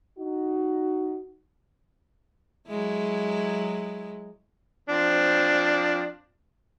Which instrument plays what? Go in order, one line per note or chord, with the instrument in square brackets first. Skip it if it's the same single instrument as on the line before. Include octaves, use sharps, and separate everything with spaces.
[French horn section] D#4 F#4
[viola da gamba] F#3 G#3 E4
[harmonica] F3 C4 D4